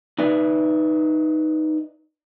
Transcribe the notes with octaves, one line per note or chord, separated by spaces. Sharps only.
D#4 B4 D5 E5